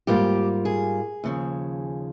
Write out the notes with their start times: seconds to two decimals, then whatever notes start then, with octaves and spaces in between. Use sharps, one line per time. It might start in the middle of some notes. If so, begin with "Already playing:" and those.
0.07 G#2 G3 A#3 F4 G4
0.65 G#4
1.24 D#2 C#3 F3